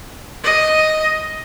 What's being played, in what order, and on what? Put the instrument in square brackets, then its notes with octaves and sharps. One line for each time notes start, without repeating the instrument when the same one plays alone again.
[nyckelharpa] D#5